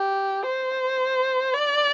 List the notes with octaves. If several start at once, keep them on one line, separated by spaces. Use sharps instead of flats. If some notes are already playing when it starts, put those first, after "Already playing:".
Already playing: G4
C5
D5